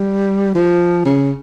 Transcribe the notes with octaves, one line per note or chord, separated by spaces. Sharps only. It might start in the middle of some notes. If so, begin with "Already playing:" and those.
Already playing: G3
F3
C#3